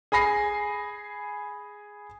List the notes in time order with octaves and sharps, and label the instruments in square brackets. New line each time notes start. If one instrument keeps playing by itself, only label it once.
[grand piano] G#4 G#5 B5 A#6 C7